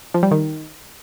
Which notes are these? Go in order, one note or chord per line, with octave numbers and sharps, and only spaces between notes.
F3
G3
D#3